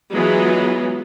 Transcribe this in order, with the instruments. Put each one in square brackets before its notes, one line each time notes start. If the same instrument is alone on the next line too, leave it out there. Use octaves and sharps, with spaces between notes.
[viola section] E3 F#3 G#3 B3 F4